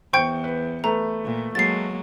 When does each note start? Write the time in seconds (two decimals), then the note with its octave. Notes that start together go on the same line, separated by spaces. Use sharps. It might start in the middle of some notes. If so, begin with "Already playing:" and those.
0.13 E2 C5 G5 C#6 G6 C#7 D7
0.44 B4
0.84 A3 B4 A#5
1.25 A#2
1.55 F#3 G#3 A#3 A6 C7